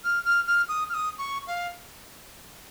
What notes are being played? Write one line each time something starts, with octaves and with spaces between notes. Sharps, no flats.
F6
F6
F6
D#6
F6
D#6
C#6
F5